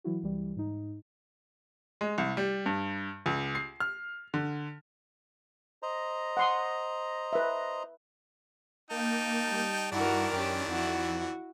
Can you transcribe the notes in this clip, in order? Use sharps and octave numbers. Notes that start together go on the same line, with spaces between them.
E3 F#3 E4 F#4
C2 E3 G3
G#2 D#4
G#3
C2
G3
G2
C#2
C7
F6
D3
C5 D#5 A#5
F#5 C6 D#6
B4 E5
A#3 D#4 G5 A5
G3
G2 D#3 E3 D4 E4 F#4 A#4
F#2 C#4 G4
F2 E4 F#4